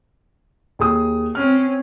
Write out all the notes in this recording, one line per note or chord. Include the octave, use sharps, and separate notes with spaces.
D#2 G#4 D#6
C4 C#4 F6